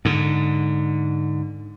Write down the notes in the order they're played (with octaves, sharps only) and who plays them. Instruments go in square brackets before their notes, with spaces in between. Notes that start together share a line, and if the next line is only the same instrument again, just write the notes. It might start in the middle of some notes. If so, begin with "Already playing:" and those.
[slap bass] G#2 D3